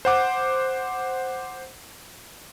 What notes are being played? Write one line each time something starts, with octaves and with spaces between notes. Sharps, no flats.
C5 F#5 D6